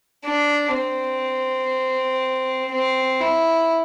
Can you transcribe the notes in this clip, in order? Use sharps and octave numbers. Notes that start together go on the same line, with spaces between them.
D4
C4
C4
E4